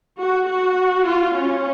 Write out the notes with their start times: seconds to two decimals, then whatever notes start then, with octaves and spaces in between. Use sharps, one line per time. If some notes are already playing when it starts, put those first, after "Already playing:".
0.19 F#4
0.49 F#4
1.08 F4
1.37 C#4